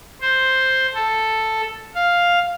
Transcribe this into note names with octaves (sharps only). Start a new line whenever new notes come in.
C5
A4
F5